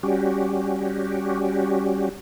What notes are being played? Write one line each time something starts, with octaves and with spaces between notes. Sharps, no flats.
G3 C#4 F#4 G4